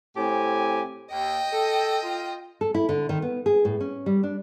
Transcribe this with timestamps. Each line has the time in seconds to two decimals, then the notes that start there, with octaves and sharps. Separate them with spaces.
0.17 A2 C4 G4 G#5
1.12 D#2 D#5 G5
1.53 A4
2.03 F4
2.61 A4
2.74 E4
2.89 D3
3.09 D#3
3.22 B3
3.46 G#4
3.65 A2
3.81 C#4
4.06 G3
4.23 D4